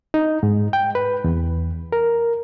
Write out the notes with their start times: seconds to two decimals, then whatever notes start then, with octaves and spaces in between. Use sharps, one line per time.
0.14 D#4
0.43 G#2
0.73 G5
0.95 B4
1.24 E2
1.92 A#4